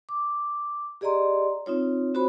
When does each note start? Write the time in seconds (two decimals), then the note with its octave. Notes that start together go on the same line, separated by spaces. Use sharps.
0.09 D6
1.01 G4 G#4 D5 D#5 A#5 C6
1.66 C4 D#4 F4 C#5
2.14 C4 F#4 C5 C#5 B5